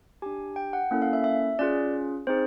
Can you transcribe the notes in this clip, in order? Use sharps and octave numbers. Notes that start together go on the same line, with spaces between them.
D4 G4 G#5
G5
F#5
A#3 C#4 E4 A4
F5
E5
E5
C#4 F4 G#4 D5
C4 D#4 G#4 C5